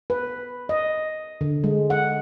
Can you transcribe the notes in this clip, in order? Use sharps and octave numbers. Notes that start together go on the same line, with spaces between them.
B4
D#5
D3
G#3
F#5